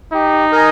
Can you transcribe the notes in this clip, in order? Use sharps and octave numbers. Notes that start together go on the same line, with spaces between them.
D#4 G4
A#4 D#5 G#5